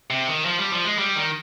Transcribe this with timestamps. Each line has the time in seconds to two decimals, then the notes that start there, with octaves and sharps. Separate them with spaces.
0.10 C3
0.28 D#3
0.45 F3
0.59 G3
0.72 F3
0.85 G#3
0.99 G3
1.16 D#3